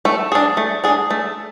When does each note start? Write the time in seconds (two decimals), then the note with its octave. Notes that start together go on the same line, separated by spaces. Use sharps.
0.05 A3
0.32 D4 G#4
0.57 A3
0.84 D4 G#4
1.10 A3